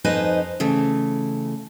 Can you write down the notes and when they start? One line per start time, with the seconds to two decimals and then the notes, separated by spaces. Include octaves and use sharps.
0.04 F2 D#4 B4 C5 D#5 G#5
0.60 C#3 E3 A3